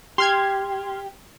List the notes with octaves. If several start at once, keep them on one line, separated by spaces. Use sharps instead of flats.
G4 C6 F6 G#6